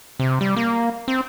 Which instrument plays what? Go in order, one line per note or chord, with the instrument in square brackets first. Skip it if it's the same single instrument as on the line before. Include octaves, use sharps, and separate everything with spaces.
[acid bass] C3
G3
A#3
C4